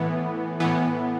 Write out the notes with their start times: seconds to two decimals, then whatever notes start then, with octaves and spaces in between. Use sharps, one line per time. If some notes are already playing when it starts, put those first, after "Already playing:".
Already playing: A2 E3 B3
0.60 A2 E3 B3